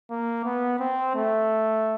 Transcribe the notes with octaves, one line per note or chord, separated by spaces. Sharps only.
A#3
B3
C4
A3